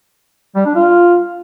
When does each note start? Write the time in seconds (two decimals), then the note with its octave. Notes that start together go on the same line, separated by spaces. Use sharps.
0.56 G3
0.65 D4
0.75 F4